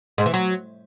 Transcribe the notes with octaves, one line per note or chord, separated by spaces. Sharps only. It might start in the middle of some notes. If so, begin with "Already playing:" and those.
G#2
E3
F#3